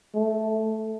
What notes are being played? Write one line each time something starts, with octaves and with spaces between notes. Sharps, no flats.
A3